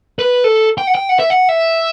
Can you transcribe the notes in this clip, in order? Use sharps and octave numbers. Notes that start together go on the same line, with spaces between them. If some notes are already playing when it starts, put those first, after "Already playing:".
B4
A4
G5
F#5
G5
F#5
E5
F#5
E5